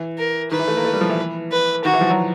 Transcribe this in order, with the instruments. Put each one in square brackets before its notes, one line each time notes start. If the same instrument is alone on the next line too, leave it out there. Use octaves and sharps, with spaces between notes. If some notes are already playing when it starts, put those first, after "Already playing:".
Already playing: [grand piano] E3
[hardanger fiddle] A#4
[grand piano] D#3 [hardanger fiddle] B4
[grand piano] E3
A3
A#3
A3
G3
F3
E3
[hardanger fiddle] B4
[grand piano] D#3 [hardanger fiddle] F#4
[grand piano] E3
F3
F#3